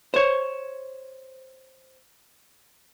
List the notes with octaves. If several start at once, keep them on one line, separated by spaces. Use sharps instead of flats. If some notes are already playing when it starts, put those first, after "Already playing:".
C5 C#5